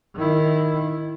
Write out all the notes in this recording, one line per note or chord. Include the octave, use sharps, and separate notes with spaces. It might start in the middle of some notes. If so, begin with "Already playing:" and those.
D#3 E4